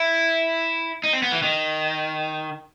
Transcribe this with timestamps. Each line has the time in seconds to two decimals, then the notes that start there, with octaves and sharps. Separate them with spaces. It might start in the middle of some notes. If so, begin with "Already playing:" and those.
Already playing: E4
1.03 D#4
1.13 C4
1.23 B3
1.32 E3
1.43 D#3